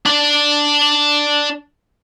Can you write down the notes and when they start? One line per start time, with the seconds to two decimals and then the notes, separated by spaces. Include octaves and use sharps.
0.06 D4 D5